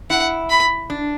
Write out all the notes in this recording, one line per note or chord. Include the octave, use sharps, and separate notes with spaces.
E4 F#5
B5
D4